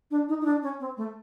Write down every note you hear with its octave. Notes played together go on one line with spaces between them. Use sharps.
D4
D#4
D#4
D4
C#4
C4
A3